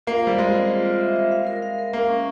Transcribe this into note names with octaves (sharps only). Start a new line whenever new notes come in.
A#3 F4
G3 C5
G#3 F4
C4
F4
F4
E5
E5
F5
A#4
F5
A#4
A#3 F5
C#4